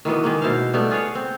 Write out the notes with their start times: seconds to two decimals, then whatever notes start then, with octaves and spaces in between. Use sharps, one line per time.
0.05 D#3 E3 F#3 B3
0.24 D#3 G#3 A#3
0.42 B2 E4 C5 F5
0.74 G3 A3 B3
0.91 F4 G#4 B4 C#5
1.15 C4